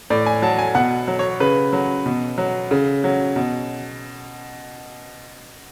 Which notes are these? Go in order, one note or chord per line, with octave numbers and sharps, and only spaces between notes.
A2 D5
G#5
F#3 A5
G#5
B2 F#5
F#3
C#5
C#3 B4
F#3
B2
F#3
C#3
F#3
B2